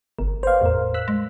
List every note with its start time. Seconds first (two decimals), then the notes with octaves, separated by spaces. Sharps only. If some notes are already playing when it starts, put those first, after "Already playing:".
0.19 G1 A#4
0.43 B4 C5 D5 F5
0.61 E2 A2 A#4
0.94 E6 F#6 B6
1.08 G#3